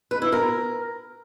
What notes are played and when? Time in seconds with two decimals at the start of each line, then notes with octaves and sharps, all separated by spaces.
0.11 B4
0.22 E4
0.32 A#4